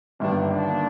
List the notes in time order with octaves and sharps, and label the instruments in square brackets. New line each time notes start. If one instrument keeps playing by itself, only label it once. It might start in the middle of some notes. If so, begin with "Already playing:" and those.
[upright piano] G1 G2 D#3 [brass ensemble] A#3 D4
[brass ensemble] A#3 D4